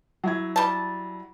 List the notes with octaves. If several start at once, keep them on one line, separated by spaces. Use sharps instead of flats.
F#3 E4 G#6
G3 A5